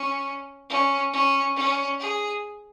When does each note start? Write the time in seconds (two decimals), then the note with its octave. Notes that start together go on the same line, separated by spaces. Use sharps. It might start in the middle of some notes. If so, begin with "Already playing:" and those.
Already playing: C#4
0.69 C#4
1.13 C#4
1.56 C#4
1.99 G#4